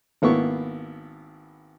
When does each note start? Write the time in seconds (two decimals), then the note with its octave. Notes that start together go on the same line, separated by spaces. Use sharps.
0.22 G#1 A#3 B3 E4 C#6